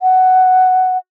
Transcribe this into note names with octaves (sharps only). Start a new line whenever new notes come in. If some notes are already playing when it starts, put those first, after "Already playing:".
F#5